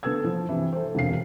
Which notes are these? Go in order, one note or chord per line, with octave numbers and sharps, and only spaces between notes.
D3 B3 A4 E6 G#6
F3
G2 C3 E3
A4 C5
E1 D2 C3 F5 C7